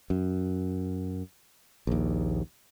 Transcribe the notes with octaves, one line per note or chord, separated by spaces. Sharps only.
F#2
A#1 D#2